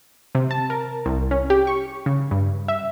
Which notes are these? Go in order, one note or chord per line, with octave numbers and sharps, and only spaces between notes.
C3
A5
A#4
C2
C#4
G4
C#6
C#3
G2
E5